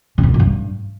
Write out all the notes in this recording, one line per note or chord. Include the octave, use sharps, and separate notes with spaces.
C#3
C3
B2
A#2
G2